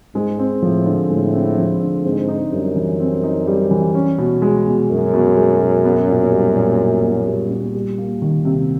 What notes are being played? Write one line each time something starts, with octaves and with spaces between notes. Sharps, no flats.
G#2 G#3
C4
A2 F3
D3
A2 G#3
C4
F3
D3
G#2 C4
D#4
F#2 G3
E3
C4
D#4
G3
E3
C#4
B2
G#3
B2
F#2 C#4
B2
G#3
B2
B3
A#2
G3
A#2
B3
A#2
G3
A#2
G3
A#3
D#3
C3